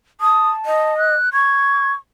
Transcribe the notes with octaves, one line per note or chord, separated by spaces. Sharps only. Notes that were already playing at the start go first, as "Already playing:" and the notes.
A5 D#6
D#5
F#6
C#6 G#6